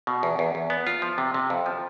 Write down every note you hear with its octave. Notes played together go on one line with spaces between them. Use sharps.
B2
E2
E2
E2
B3
F4
F3
C3
C3
F2
F3